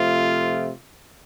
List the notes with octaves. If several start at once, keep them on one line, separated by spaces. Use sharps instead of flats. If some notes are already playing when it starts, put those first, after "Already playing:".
Already playing: C3 F3 A3 F4